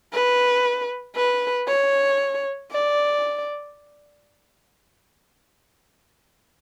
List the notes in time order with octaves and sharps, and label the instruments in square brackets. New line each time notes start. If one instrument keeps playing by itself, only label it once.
[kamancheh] B4
B4
C#5
D5